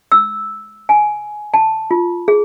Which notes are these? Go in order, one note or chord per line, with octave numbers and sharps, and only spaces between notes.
E6
G#5
A5
F4
G#4